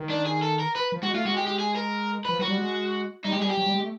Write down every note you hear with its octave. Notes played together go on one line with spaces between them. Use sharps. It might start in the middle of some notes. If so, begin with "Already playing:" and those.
Already playing: D#3
D4
G#4
A4
A#4
B4
F3
G#3 F#4
A3 F4
G#3 F#4
G4
G4
G#4
A#4
F3 B4
F#3 F#4
G3
G#3
G3 D#4
G#3 G4
G3 G#4
G4
F#3
G3
G#3
A3